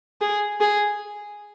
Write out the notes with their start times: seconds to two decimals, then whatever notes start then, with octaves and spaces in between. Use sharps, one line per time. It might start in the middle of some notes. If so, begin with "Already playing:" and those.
0.21 G#4
0.61 G#4